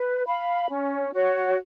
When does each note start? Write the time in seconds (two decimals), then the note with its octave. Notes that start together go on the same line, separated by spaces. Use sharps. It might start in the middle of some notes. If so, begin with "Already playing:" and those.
Already playing: B4
0.26 F5 B5
0.69 C#4
1.13 F#4 C#5